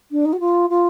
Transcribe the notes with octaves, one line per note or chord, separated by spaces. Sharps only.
D4
D#4
F#4
F4
F4